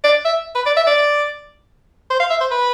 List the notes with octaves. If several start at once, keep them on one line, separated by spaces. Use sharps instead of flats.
D5
E5
B4
D5
E5
D5
C5
F5
E5
C5
B4